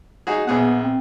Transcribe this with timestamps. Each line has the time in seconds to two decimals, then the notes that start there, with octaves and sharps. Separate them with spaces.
0.27 D#4 F#4 G#4
0.47 A#1 B3 G#4 F#5
0.83 C4